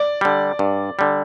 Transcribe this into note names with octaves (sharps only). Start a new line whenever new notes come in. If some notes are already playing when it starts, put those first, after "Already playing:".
Already playing: D5
D3 G3
G2
D3 G3